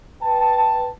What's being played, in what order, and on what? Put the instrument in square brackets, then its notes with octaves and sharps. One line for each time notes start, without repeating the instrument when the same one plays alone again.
[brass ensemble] B4 G5 A5